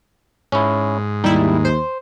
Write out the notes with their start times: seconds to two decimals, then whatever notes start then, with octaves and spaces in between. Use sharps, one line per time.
0.52 G#2 C#4 E4
1.24 D#2 G3 D#4 E4
1.65 C5